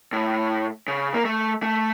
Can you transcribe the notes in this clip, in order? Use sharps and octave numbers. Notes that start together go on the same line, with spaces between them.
A2
C#3
A#3
A3
A3